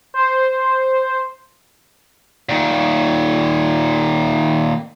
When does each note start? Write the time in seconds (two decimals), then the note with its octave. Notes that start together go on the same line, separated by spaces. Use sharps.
0.14 C5
2.49 A#2 D#3